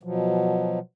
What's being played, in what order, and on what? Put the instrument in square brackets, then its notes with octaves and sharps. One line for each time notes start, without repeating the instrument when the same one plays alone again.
[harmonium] B2 F3 F#3